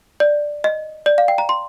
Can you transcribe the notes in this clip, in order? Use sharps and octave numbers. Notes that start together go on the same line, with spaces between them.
D5
D#5
D5
F5
G5
A#5
C6